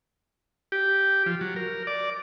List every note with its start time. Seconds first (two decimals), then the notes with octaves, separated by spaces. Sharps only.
0.72 G4
1.26 F3
1.41 F#3
1.56 A#4
1.87 D5